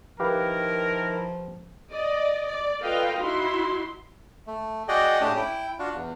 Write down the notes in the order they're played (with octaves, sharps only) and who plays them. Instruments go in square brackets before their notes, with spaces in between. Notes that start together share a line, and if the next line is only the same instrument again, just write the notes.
[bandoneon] D#3 E4 [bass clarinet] F3 [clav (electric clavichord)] G4 B4 F5 [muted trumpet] A#4
[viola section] D5 D#5
D5
F4 A4 B4 D#5 F5 G5
D#4 E4 F#4 C6
[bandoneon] A3
F#4 G#4 D5 D#5 G5
A2 A3 C#4 D4 G4 D#6
E4 G5
D4 F4 F#4
E2